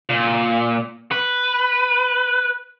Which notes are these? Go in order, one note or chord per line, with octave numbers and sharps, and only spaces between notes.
A#2
B4